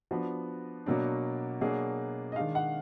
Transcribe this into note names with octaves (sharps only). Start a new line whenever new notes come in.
F3 B3 D4 F#4
B2 F#3 A#3 D4
B2 F#3 A#3 D4 G#4
D#5
D#3 G#3 D4 F5
F#5